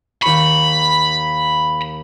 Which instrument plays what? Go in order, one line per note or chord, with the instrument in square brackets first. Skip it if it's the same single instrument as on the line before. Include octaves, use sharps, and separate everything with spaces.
[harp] D#2 C#6 [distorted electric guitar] B5